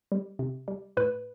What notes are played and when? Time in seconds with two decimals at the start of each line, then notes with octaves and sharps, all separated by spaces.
0.12 G3
0.39 C3
0.68 G3
0.97 A2 B4